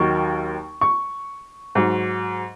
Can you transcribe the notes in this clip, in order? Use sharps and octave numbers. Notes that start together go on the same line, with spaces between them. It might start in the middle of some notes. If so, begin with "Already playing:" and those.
Already playing: D#2 D#3 F#3 C#6
C#6
G#2 F#3